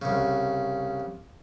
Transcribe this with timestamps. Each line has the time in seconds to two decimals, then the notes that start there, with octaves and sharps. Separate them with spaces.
0.02 C2 C#3